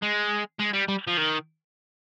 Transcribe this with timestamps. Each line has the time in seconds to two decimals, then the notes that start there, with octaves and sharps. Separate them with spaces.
0.02 G#3
0.60 G#3
0.74 G3
0.88 G3
1.07 F3
1.17 D#3